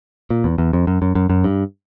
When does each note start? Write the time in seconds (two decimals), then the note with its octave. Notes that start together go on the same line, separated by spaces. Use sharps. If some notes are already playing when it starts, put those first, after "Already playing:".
0.30 A#2
0.44 E2
0.58 E2
0.73 F2
0.87 F#2
1.02 F#2
1.15 F#2
1.30 F#2
1.44 G2